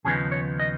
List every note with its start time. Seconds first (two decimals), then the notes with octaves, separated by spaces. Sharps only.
0.05 D#2 C#3 F3 B3 D#4 G#4
0.32 C#5
0.60 D#5